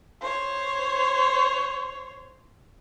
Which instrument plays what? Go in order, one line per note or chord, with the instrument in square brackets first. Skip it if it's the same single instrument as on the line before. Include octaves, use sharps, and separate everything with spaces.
[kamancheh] C5 C#5